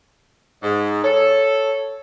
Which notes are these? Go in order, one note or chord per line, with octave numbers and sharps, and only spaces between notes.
G#2
A4 C#5